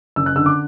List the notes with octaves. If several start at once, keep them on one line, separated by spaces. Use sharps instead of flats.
F#1 E6
F#6
D3 E6
D6